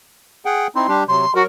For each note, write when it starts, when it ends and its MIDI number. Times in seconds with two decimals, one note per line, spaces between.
0.45 0.67 68
0.45 0.67 78
0.45 0.67 79
0.75 0.87 60
0.75 0.87 63
0.75 0.87 64
0.75 0.96 84
0.88 1.04 55
0.88 1.04 62
0.88 1.04 67
1.08 1.26 48
1.08 1.26 54
1.08 1.34 84
1.35 1.46 54
1.35 1.42 66
1.35 1.46 70